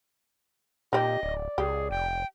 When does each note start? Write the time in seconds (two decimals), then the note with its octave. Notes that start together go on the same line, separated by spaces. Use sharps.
0.93 A#2 C4 D#4 G4 D#5
1.23 D1 D5
1.58 C#2 G4 G#4
1.91 F1 G5